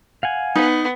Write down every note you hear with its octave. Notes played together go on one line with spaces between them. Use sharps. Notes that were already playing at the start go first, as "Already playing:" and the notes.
F5 F#5 G#5
B3 D#4